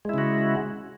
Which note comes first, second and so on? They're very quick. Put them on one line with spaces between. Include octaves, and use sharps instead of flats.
G#3 E4 C#3 F#4